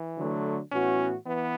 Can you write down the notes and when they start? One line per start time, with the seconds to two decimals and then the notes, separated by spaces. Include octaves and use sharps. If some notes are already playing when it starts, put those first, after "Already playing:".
Already playing: E3
0.17 D3 F#3 A3
0.71 A2 E3 B3 C#4 F#4
1.26 E3 B3